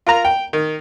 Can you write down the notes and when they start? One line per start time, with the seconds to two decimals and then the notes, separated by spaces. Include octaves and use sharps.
0.07 F4 A#4 A#5
0.25 G5
0.53 D#3